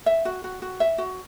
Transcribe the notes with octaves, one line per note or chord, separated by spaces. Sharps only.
E5
F#4
F#4
F#4
E5
F#4